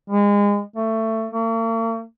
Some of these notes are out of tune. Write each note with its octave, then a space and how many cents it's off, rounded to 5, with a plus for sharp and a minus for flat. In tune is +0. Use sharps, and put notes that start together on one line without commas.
G#3 -30
A3 +20
A#3 -45